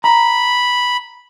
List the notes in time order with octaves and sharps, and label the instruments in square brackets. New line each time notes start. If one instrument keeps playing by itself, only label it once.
[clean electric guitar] A#5 [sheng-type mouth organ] B5